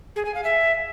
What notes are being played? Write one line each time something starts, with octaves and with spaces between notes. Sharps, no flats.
G#4
G#5
F5
E5